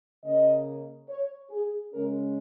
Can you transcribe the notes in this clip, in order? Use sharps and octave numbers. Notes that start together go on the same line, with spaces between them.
C#3 A#3 C#4 D#5
C#5
G#4
C#3 G#3 C#4 A#4